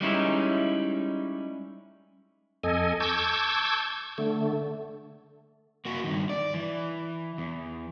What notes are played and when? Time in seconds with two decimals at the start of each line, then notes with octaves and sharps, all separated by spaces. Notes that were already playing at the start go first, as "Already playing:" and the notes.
0.01 G3 G#3 C#4 D#4 E4
2.64 F2 A4 D#5 G#5
3.00 A5 C#6 D6 E6 G6 G#6
4.18 D3 A3
5.85 A#3 F#4
6.04 G2 D#3
6.29 D5
6.54 E3
7.38 E2